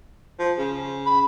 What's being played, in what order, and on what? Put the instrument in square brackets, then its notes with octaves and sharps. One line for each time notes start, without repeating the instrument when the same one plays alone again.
[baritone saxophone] F3
C#3
[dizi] B5